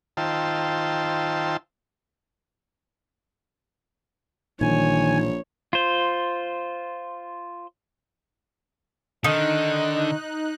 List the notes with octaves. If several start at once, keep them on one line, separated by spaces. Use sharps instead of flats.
D#3 F4 C5 G5 A5 E6
A#1 A#2 D#3 E3 G3 C#5 G#5
F4 C5
D3 D#3 D#4 D#5 F#6